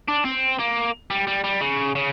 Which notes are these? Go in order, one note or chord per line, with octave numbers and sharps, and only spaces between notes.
D4
C4
A#3
G3
G3
G3
C#3
C#3